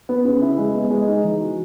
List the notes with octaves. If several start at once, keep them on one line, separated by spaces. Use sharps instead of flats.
B3
C#3
E4
G#3
B3
G#3
D#4
E3
F#4